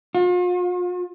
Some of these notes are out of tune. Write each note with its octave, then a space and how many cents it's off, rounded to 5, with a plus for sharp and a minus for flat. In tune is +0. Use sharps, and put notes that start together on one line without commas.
F4 +40